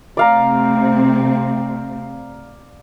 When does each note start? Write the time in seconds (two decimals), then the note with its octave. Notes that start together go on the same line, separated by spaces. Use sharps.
0.17 C3 A3 C4 D5 F5 A#5